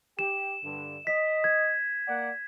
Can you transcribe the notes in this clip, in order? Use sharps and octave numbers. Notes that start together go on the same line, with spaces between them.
G4 E7
G2 D3
D#5 B6
G#6
A#3 D5 F#5